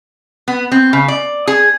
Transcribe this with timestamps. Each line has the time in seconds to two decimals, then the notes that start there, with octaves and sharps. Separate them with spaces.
0.48 B3
0.72 C4
0.93 C#3
1.08 D5
1.47 G#4